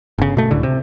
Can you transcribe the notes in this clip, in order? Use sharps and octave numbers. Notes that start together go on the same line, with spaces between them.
G1 C#3
B2 A3
C#2 A2 D3
C3